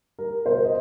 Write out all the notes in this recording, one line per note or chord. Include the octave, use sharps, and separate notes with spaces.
G3 A#4
B2 C5
D#5